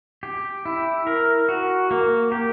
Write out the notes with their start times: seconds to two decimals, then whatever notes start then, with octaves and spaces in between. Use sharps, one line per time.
0.23 G4
0.65 E4
1.07 A#4
1.49 F#4
1.91 A#3
2.32 G4